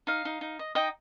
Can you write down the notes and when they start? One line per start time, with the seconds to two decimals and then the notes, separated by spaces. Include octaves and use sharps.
0.07 D#4 F5
0.25 D#4
0.41 D#4
0.59 D#5
0.75 D#4 D#5 G5